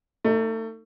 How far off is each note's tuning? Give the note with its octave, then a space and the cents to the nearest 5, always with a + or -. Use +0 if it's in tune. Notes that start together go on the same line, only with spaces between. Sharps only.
A3 +30 D#4 +0